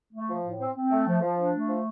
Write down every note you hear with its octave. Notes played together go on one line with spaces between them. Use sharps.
A3
F3
A2
C4
C4
A3
F3
F3
D4
A3
F3